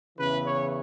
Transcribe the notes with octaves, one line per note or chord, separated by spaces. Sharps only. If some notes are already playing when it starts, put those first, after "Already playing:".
E2 C#3 E3 B4
C#5